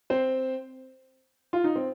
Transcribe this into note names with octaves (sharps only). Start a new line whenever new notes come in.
C4 C5
F4
D#4
C4